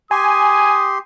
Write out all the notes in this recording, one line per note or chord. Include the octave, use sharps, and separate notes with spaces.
G4 G#5 C6 D#6